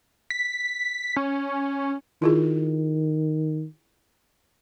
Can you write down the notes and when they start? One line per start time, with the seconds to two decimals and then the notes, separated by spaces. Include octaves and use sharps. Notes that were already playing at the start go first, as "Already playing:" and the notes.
0.30 B6
1.16 C#4
2.22 D#3 E4 F4 G#4